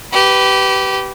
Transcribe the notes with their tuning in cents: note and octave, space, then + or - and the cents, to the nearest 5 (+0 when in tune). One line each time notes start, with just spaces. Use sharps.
G4 -20 B4 +5